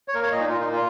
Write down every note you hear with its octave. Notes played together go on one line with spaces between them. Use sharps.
C#5
A#3 A#4
C#5
A#2 D#5
D#4
A#2 F4
D#4
A#3
F4